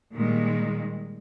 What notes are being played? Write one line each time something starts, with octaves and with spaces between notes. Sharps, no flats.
A#2 D#3 G3 G#3